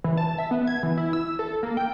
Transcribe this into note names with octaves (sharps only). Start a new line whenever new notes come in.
E3
A5
E5
B3
G#6
E3
E4
E6
A4
A#3
G5